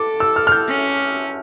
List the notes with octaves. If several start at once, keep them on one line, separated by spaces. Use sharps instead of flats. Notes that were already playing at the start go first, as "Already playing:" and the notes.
Already playing: A4 D6
E6
F6
F6
G6
C#4